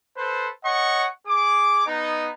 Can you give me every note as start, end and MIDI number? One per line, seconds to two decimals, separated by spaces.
0.16 0.48 69
0.16 0.48 71
0.16 0.48 72
0.64 1.06 73
0.64 1.06 75
0.64 1.06 78
0.64 1.06 85
1.27 1.84 68
1.27 1.84 86
1.87 2.29 59
1.87 2.29 63